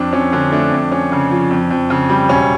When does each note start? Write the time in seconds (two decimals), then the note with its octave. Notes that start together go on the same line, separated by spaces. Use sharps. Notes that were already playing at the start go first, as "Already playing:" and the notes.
Already playing: F2 D4
0.13 F2 C#4
0.32 D3 C#4
0.52 A3 D4
0.72 F2
0.91 C#4
1.12 C#3
1.31 F3
1.51 F2
1.70 F2
1.90 C#3
2.10 G3
2.29 E1 C#4